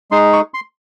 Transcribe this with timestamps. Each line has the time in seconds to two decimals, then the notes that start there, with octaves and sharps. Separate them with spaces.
0.11 G#3 D#4 G#4 C6
0.33 C#6
0.54 C6